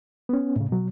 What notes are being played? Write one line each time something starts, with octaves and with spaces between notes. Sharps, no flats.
B3 C#4
A2 C#3
B2 F#3